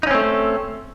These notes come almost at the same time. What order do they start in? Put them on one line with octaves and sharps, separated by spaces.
D#4 C#4 C4 A3